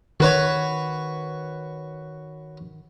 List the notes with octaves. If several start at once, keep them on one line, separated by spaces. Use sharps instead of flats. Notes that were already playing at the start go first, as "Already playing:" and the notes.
D#3 F#4 B4 C#5